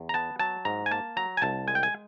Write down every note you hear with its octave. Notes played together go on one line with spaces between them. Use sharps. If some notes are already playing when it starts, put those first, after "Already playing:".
Already playing: E2
A#5
B3 A5
F#3 A5
G#2 A#5
G#5
A#3 A5
F#3 A#5
G#5
C2 A5
G#3 G#5
G5
G#5